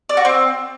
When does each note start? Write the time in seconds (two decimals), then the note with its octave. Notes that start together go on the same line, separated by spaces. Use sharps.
0.09 D5
0.17 F#4
0.25 C4